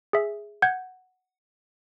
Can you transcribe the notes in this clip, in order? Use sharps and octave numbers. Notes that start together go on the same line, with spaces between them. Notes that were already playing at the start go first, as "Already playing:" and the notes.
G#4 E5
F#5 G6 G#6